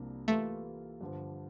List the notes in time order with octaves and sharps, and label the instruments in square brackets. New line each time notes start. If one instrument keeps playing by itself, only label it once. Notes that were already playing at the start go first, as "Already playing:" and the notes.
Already playing: [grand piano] C2 C3 F3 A#3 D4
[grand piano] E3 G3 A#3 F4 A4 [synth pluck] A3
[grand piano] G2 D3 F3